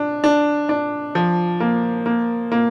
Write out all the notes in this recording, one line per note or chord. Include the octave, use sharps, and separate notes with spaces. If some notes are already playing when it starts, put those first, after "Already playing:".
Already playing: D4
D4
D4
F3
A#3
A#3
A#3